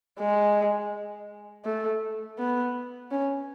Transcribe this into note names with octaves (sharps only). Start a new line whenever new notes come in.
G#3
A3
B3
C#4